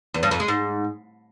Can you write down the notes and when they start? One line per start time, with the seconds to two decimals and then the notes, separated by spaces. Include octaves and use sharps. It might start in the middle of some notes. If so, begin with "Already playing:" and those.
0.14 E2
0.23 G2
0.31 F2
0.40 G#3
0.48 G#2